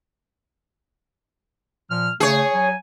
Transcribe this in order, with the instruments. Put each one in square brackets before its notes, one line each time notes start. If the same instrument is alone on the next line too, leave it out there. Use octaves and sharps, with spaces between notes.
[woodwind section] A#2 F3 F6
[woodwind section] C#3 A3 [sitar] G#4 C#5
[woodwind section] F#3 G#5